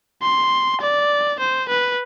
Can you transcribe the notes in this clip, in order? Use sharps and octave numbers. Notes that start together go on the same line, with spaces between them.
C6
D5
C5
B4